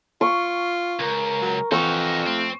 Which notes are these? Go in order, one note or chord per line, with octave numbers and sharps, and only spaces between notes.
F4 C#6
C#2 A#4
F#3
F2 E3 D#4 F#4 C#6
A3 C4